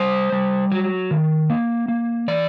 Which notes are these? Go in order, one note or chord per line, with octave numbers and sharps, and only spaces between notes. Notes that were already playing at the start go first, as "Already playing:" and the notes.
Already playing: G3 C5
G3
F#3
D#3
A#3
A#3
E3 D5